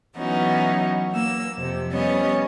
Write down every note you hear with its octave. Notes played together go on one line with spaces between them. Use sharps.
E3 F#3 B3 C#4 D#4 F#4
A#3 E6
F2 C3
G3 B3 C#4 C#5 D#5